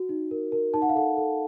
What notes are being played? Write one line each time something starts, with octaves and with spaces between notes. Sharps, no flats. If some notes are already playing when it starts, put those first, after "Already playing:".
Already playing: F#4
D#4
A#4
A#4
D#4 A5
F#5
F5
A4 F#5
A4